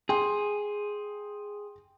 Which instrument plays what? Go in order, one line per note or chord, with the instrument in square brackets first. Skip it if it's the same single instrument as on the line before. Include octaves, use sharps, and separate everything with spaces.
[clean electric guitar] G#4 [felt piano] G5 C6